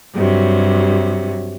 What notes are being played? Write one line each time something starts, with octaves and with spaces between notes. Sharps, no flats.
G2 C3 F#3